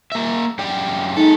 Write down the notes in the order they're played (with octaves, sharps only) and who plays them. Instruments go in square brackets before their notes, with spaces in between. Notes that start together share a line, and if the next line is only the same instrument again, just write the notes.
[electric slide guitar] A#3 E5
F#2 D5 G5
[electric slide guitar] G#3 A4 [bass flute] D#4